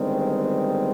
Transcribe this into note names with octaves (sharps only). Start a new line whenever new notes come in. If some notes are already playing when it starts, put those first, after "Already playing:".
Already playing: G1 G2 D#3 G#3 C4